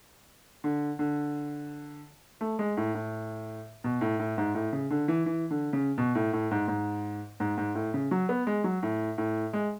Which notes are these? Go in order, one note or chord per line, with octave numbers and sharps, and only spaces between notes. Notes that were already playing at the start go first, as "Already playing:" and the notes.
D3
D3
A3
G#3
A2
A2
B2
A2
A2
G#2
A2
C#3
D3
E3
E3
D3
C#3
B2
A2
A2
G#2
G#2
G#2
G#2
A2
C#3
F#3
B3
G#3
F#3
A2
A2
G#3